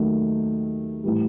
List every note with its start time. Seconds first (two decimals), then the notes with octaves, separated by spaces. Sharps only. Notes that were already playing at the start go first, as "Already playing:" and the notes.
Already playing: D#2 D#3 F#3 A3
1.04 A2 E3 G3